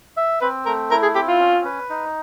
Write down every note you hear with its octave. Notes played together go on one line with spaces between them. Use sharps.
E5
C4 B4
A3 A#4
E4 A#4
G#4
C4 G4
F4
C#4
B4
D#4